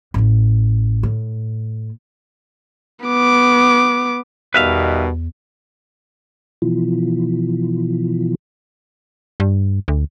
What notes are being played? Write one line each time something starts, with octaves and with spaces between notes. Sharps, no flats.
A1 E3
A2
B3 D6
E2 B2 D#3 G3 B4 E5 F5
B2 E3 F3
G2
D2